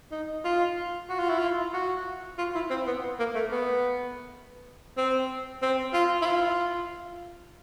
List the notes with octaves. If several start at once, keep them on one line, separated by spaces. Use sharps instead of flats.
D#4
F4
F#4
F4
E4
F4
F#4
F4
E4
C4
B3
A#3
A3
B3
C4
C4
F4
E4
F4